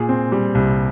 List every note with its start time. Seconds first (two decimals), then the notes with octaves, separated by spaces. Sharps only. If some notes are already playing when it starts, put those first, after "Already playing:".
Already playing: A#2 G#4
0.09 C4
0.32 G3
0.55 C2